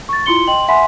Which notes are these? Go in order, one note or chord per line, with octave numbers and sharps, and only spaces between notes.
C#6 A6
E4 F4 C6 C#7 G7
D#5 G5 C6 F#7
E5 F#5 G#5 B5 C6 B6